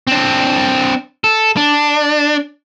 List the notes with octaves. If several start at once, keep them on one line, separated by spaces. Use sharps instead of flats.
C4 D4
A4
D4